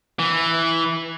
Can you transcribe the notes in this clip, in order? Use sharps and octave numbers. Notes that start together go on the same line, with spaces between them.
E3